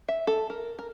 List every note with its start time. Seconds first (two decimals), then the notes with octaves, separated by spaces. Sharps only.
0.08 E5
0.27 A4
0.50 A#4
0.79 A#4